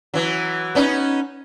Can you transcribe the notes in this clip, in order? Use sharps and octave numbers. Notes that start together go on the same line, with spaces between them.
E3 F#3
B3 C#4 D#4